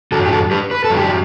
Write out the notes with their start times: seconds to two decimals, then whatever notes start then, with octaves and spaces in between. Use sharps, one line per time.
0.12 F#2 F#3 F#4 A4
0.26 G4
0.31 F#4 A4
0.51 G4 B4
0.71 B4
0.85 A4
0.90 F#2 F#3
0.97 G4